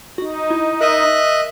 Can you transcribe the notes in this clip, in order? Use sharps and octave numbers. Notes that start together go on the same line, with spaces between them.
D#4 F#4
E4
A#4 D#5 E5 F#6